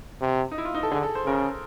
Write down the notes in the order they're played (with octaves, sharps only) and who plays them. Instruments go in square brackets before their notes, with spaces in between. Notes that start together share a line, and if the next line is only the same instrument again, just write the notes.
[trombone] C3
[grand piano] D#4
E4
F4
D#4
A4
[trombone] D3 [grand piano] G#4
[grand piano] A4
C5
[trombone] C#3 [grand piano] A#4